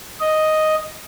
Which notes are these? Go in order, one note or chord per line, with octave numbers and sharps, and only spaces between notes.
D#5